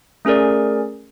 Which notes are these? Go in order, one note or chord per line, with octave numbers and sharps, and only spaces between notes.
A3 C#4 G#4 A#4 D5